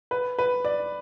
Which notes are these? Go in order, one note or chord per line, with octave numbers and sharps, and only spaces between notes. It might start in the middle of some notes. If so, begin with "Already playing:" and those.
B4
B4
D5